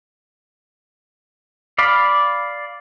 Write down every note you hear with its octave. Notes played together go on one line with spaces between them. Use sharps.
D5 F5 B5